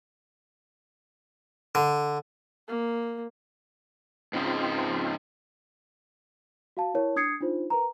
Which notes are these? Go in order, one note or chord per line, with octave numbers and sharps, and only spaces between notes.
D3
A#3
G#2 C#3 G#3 C4 F4
F#4 F5 A5
E4 A#4 C#5 A5
D4 D#6 G#6 C7 C#7
D4 D#4 F4 C5
A#4 B4 A#5